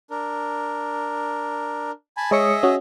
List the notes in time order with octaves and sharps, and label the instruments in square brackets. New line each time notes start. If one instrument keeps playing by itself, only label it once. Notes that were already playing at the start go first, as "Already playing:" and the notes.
[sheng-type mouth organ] D4 A#4
G#5 A5 B5
[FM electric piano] G#3 C#5 C#7 [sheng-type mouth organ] G#4 D#5 E5
[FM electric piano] C#4 F#4